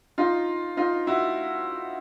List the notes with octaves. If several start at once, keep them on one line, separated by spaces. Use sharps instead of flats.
D#4 F4
D#4 F4
E4 F#4